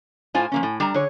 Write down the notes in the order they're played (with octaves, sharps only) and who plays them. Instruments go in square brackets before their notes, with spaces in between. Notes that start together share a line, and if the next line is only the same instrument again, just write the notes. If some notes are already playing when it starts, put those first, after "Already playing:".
[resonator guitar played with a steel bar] A2 F4 C5 [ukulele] G#5
[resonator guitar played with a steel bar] F3 A#3 C#4
A2
[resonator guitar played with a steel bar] G3 A#5 [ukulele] D4
[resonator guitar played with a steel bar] D3 [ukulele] G#4 C#5